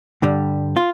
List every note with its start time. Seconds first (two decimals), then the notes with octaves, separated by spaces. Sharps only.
0.22 G2 D3 G3
0.77 F4